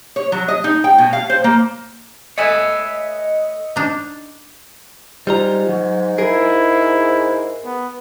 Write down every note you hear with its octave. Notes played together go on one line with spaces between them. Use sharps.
C#5
F#3
D#5
D#4
G5
B2
F5
C5
A#3
A3 B4 C#5 D#5 E5 G#5
D4 D#4
G#2 G3 F4 A#5
F#3
E4 G#4 A#4
B3